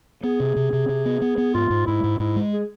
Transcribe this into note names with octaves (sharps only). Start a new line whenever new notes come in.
B3 G#4
C3
C3
C3
C3
B3
B3
B3
G#2 F4
G#2
G#2 E4
G#2
G#2 E4
G#3
G#4